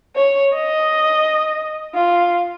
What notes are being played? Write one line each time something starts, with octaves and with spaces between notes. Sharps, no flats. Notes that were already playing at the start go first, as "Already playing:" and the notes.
C#5
D#5
F4